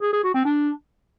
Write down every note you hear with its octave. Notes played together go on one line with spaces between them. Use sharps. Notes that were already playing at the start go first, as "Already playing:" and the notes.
G#4
G#4
F#4
C4
D4